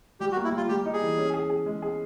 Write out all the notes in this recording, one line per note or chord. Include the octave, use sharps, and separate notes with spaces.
G3 G4
F#4
A#3
E4
G3 F4
G3 G4
D#4
G#4
E3
C#4
G#4
G#4
G#3
G#4